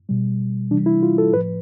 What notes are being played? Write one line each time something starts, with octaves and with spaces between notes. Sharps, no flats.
B2 G3
C3 E3 G3 D4
E4
F4
A4
A2 F3 B4